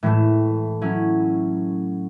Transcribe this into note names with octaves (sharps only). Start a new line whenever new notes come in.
A2 E3 A3
F#3 C#4 E4